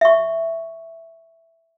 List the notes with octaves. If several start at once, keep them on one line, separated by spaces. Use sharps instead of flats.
E5 C#6